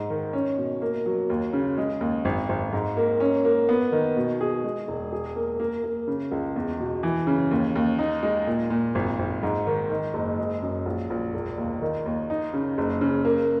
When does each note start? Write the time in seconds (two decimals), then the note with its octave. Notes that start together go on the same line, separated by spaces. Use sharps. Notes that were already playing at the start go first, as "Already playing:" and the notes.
Already playing: G#2
0.10 D#3
0.33 C#4
0.58 B2
0.82 A#3
1.06 F#3
1.30 D#2
1.53 C#3
1.77 G#3
2.01 D#2
2.25 G#1
2.49 G#1
2.73 G#2
2.97 A#3
3.20 C#4
3.45 A#3
3.69 B3
3.92 D#3
4.16 B2
4.41 G#4
4.64 G#3
4.88 E1
5.12 G#4
5.36 A#3
5.60 A#3
5.84 A#3
6.08 C#3
6.32 C#2
6.56 E2
6.80 B2
7.03 E3
7.27 C#3
7.51 D#2
7.76 D#2
7.99 D#4
8.23 G#3
8.47 A#2
8.70 A#2
8.95 G#1
9.19 G#1
9.43 G#2
9.67 D#3
9.90 D#3
10.14 F#1
10.39 G#3
10.62 F#2
10.86 A#1
11.10 A#1
11.34 E1
11.57 D#2
11.82 D#3
12.06 D#2
12.30 D#4
12.54 C#3
12.78 F#1
13.01 C#3
13.25 A#3